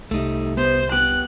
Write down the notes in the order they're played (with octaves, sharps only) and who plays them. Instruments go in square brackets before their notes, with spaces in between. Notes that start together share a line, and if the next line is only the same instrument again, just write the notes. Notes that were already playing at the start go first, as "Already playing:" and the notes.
[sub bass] C2 [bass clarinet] C3 [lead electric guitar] A3 D#4
[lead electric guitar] B3 [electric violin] C5
[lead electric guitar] B3 G4 [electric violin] F#6